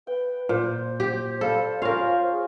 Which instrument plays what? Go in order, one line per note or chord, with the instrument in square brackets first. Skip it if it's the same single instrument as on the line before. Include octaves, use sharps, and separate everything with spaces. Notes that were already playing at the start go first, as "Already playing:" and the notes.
[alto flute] B4 [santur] G5
[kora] A#2 [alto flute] C5
[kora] G4
[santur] G3 F5 [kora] A4
[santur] C#4 F4 G#5 [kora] A#4 F5
[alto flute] G#4